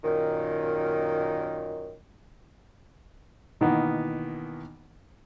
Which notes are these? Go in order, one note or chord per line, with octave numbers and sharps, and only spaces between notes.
F#2 A#2 D#3
B2 D#3 E3 A#3 B3